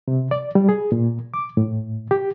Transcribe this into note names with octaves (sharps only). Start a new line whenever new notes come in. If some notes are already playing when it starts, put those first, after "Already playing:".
C3
D5
G3
G#4
A#2
D6
A2
G4